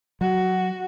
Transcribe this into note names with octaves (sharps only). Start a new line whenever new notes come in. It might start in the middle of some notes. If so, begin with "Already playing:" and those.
F#3 F#4